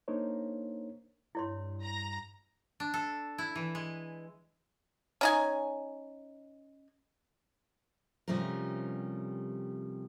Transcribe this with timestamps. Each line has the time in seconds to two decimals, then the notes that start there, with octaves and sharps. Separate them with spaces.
0.08 A#3 D4 D#4 A#4 C5 C#5
1.35 G2 E4 C#5 C6
1.84 A#5
2.80 D4
2.94 A4
3.38 E4
3.55 E3
3.75 G#3
5.21 C#4 D#4 G#5
8.28 C3 F3 G3 A3 C#4 A#4